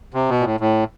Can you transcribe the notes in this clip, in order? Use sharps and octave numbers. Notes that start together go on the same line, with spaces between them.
C3
B2
A#2
A2
A2